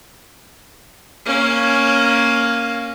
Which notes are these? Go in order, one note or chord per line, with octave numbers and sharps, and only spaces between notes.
A#3 C#4